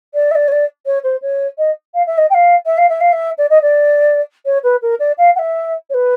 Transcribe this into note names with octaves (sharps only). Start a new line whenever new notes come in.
D5
E5
D5
C#5
D5
C#5
C5
C#5
D#5
F5
E5
D#5
G5
F5
E5
F5
E5
F5
E5
D5
D#5
D5
C#5
B4
A#4
D5
F5
F#5
E5
C#5
B4